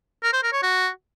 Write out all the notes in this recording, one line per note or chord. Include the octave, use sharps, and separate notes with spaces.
A#4
C5
A#4
C#5
F#4